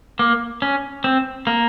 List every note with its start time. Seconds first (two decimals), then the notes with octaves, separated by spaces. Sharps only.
0.19 A#3
0.62 C#4
1.04 C4
1.47 A#3